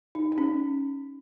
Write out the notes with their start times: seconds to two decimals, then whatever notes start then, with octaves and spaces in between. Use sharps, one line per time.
0.15 D#4
0.32 D#4
0.38 C#4